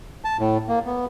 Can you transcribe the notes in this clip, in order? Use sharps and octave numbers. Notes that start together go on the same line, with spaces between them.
A5
A2
A#3
B3